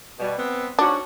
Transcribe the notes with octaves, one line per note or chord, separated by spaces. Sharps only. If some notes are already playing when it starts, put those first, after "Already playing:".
B2 G3
B3 C4
G#2 C#4 D4 F#4